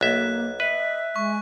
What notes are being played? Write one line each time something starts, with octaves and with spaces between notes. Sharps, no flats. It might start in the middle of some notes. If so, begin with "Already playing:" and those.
B1 A#3 E5 F#6
B4 D#5 E5
G#3 C#6